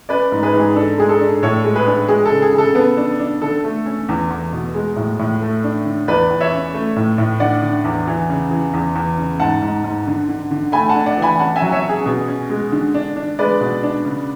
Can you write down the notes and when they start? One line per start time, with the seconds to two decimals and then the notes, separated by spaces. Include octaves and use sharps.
0.09 C#4 B4 D5
0.32 G#2
0.43 G#4 B4
0.54 G#2
0.59 G#4
0.76 D4 A4
0.98 G#3 G#4
1.09 A4
1.20 D4
1.43 A2 A4 C#5
1.64 G#3
1.75 G#4 B4
1.87 D4
2.08 G#3 G#4
2.26 A4
2.31 C#3
2.42 G#4
2.53 C#3
2.58 A4
2.75 B3
2.97 D4
3.19 D4
3.41 D3 A4
3.64 A3
3.86 C#4
4.09 E2
4.31 E2
4.53 B2
4.74 G#3
4.96 A2
5.19 A2
5.41 A3
5.64 D4
5.85 D3
6.08 E2 B4 D5
6.30 E2
6.41 C#5 E5
6.52 C#4
6.74 A3
6.96 A2
7.18 A2
7.40 D3 D5 F#5
7.62 D3
7.85 E2
8.07 E3
8.30 C#3
8.51 E3
8.74 E2
8.95 E2
9.18 C#3
9.40 G#2 F#5 A5
9.62 G#2
9.84 G#2
10.07 D3
10.29 D3
10.51 D3
10.72 A3 G#5 B5
10.89 F#5 A5
10.96 D4
11.06 D5 F#5
11.17 E3
11.22 G#5 B5
11.39 C#4 F#5 A5
11.56 E5 G#5
11.62 F#3
11.72 C#5 E5
11.83 C#4
11.89 G#4
12.06 B2 G#4
12.27 C#4
12.50 G#3
12.72 D3
12.94 D4
13.16 D4
13.39 G#3 B4 D5
13.61 B2
13.83 D4
14.05 C#3